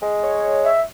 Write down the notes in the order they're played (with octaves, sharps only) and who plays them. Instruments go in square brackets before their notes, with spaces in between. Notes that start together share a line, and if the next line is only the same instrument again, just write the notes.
[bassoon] G#3
[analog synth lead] C#5
[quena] E5